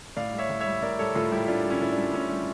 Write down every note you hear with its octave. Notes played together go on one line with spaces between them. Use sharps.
A2 D5 F5
G3
C#5 E5
A2
C#5 E5
G3
A2 A#4 D5
G3 A4 C#5
A2 F4 A4
G3 E4 G4
A2 D4 F4
G3
C#4 E4
A2 E4
D4
G3
A2 C#4
G3